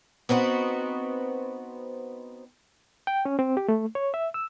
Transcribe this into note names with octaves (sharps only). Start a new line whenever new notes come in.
B3 C4 D#4 F#4
G5
C#4
C4
G4
A3
C#5
E5
E6